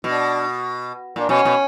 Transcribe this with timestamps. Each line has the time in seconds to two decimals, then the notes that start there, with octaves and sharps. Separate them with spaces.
0.04 B2 D4
1.16 A#2 D4
1.29 B2 C#4
1.45 B2